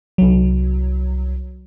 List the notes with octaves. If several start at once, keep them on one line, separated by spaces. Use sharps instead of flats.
C2 F#3